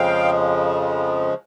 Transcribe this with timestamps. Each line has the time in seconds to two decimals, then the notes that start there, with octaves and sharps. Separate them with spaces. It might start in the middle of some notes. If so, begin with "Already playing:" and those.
Already playing: F2 C#3 F3 G#3 F5 G5